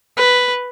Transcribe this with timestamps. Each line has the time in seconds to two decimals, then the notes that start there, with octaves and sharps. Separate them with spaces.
0.17 B4